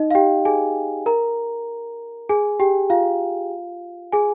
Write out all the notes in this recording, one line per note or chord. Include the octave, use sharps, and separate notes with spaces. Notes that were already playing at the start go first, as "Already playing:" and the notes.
Already playing: D#4 D#5
F5
G4 G5
G#4 G#5
A#4 A#5
G#4 G#5
G4 G5
F4 F5
G#4 G#5